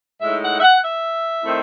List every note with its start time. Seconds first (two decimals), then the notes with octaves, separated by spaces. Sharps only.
0.20 A2 G#3 D#4 E5
0.41 F#5
0.56 E5
0.61 F#5
0.81 E5
1.42 D#3 A3 C4 E4